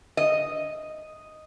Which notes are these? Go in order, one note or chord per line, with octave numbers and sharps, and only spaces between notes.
D#5